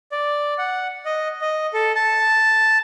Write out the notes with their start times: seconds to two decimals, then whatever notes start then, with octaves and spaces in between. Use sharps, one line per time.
0.12 D5
0.58 F#5
1.05 D#5
1.41 D#5
1.74 A4
1.95 A5